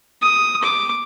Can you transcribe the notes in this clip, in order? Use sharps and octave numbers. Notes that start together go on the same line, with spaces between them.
D#6
D6